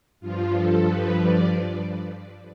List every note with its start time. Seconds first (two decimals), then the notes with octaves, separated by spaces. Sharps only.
0.20 G2 F3 F4
0.52 A4
0.83 B4
1.15 D5